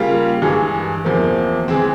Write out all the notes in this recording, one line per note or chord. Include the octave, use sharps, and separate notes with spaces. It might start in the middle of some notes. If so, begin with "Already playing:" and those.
Already playing: C#3 G3 A#3 F4
G2 E3 G#3
E2 C3 F3 A#3
E3 G#3 C4